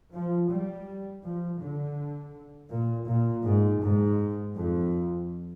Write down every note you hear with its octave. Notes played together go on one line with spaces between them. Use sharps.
F3
G3
F3
D3
A#2
A#2
G#2
G#2
F2